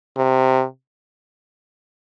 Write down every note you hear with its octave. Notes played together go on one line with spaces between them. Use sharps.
C3